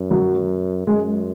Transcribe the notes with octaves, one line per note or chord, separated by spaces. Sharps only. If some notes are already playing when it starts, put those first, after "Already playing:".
Already playing: F#2
F#3
F#2 G#3